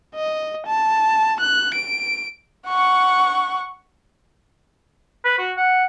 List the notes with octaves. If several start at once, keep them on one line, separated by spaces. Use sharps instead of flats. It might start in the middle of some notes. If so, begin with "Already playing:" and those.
D#5
A5
F#6
D7
F#5 C#6
B4
F#4
F#5